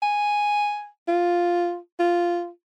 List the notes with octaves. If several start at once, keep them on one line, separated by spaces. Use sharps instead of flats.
G#5
F4
F4